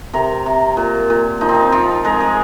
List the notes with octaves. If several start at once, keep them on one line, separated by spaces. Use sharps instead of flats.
C3 A#4
C3
A#2
A#2
F3 D#4
C4
D#4
F3 F4
G#3 A#4
G#4